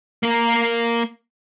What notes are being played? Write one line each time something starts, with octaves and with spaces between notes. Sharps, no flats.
A#3 A#4